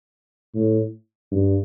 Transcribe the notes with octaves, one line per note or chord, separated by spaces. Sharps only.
A2
G2